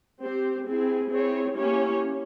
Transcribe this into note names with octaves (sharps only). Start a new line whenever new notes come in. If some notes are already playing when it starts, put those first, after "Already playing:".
C4 G4 C5
C4 E4 G#4
C4 E4 G#4 C#5
A#3 C#4 E4 G4 C#5